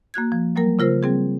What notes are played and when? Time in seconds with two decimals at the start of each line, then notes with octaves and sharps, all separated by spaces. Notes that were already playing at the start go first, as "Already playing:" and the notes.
0.14 A#3 F#4 F#6 G#6
0.32 F3
0.56 F#3 G3 A#3 A#4
0.79 C#3 F4 A#4 C5 E6
1.03 G3 C4 G#4